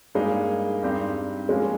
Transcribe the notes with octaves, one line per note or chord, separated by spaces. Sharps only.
G2 G3 G#3 A#3 D#4 G#4
G2 G3 C4 D#4 G4
F3 G#3 A#3 C#4 F4 G#4